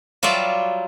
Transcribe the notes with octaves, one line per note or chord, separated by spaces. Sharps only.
F#3 G3 F4 D5 E5